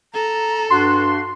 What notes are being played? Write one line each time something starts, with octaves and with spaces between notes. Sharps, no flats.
A4 A#5
G2 D4 F#4 C6